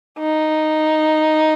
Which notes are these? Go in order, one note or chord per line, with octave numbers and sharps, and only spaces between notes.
D#4